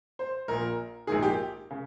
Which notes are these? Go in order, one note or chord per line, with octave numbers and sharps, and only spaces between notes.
C5
A#1 A#2 A#4
A#1 G#2 D#3 G#4
G4
C#3